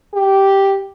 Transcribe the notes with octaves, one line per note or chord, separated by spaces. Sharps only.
G4